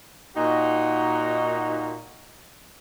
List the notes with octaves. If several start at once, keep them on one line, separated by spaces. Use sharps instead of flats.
A#2 D#4 F#4